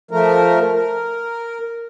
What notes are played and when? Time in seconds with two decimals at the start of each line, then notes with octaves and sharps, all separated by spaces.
0.11 F3 A3 A#4
0.75 A#4